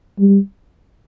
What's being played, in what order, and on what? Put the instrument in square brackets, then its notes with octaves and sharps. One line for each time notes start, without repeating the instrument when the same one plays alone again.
[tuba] G3